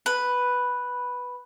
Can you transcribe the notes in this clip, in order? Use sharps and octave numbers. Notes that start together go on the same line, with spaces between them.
B4